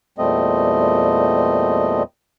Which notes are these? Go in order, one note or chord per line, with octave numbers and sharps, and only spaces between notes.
E2 A#2 G3 A3 C4 D#5